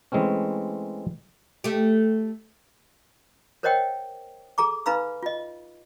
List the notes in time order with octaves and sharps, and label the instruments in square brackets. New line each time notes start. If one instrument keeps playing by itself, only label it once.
[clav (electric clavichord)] E3 G#3 A3 C4 C#4
[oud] A3 G4
[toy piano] A#4 C5 C#5 D#5 F#5 G5
G#4 A4 A#5 D6
D#4 B4 F5 A#5 B5 E6
F4 D#5